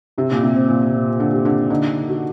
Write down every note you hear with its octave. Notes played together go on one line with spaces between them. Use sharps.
C3 G4
A#2
C3
C4
A#2
A#2
D3
G4
D3
D3 D#4
F#4